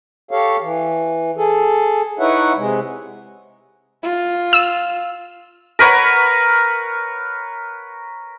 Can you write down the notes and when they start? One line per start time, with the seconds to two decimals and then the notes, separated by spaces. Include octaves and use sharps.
0.31 G4 A4 C#5 F5
0.61 E3
1.37 G#4 A4
2.19 D#4 E4 B4 C#5 E5 F#5
2.57 C3 G#3
4.03 F4
4.53 E6
5.79 A#4 B4 C#5 F#5